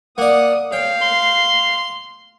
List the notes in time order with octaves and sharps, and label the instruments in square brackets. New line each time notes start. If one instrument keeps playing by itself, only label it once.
[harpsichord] A#3 D5 [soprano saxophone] F#5 [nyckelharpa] D#6
[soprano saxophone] C#5 [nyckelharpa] F5 [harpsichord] G5
[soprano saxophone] C6